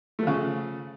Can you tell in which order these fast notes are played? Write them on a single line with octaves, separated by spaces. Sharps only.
A3 F3 C#3